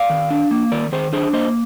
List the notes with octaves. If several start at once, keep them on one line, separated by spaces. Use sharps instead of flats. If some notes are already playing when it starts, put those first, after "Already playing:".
Already playing: D5 F5
D#3
D4
A#3
D#3 A#4 D5
D#3 G#4 C5
D4 G#4 C5
A#3 C5 D#5